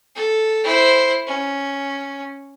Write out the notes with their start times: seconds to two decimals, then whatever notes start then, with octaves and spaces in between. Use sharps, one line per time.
0.16 A4
0.64 E4 C5
1.27 C#4